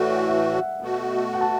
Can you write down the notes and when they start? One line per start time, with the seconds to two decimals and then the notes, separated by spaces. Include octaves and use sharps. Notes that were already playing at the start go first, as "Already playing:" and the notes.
Already playing: A2 E3 A3 F#4 D5
0.28 E5
0.54 F#5
0.80 B2 A3 F#4
1.33 F#5
1.41 A5